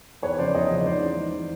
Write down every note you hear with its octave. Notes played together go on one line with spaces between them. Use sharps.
E2 B4 C#5
C#3 F3 C5 D5
E2 C#5 D#5
C#3 F3
G#2 C5 D5
E3
G#2
E3